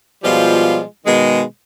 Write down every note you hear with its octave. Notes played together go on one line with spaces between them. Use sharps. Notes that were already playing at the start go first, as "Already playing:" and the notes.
B2 F3 G3 G#3 F4
B2 D#3 G#3